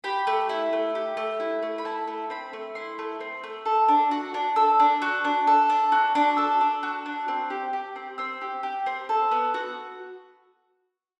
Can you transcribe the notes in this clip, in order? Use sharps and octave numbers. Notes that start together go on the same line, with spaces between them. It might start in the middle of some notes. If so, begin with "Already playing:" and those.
G4 B5
A3
E4
A3
G4
A3
E4
A3
B5
E4 A5
A3
C4 B5
A3
E4 C6
A3
C4
A3
A4
D4
F#4
D4
A4 E6
D4
F#4
D4
A4
D4
F#4
D4
A4 E6
D4
F#4
D4
C4
G4
G4
C4
C4 E6
G4
G4
C4
A4
B3
F#4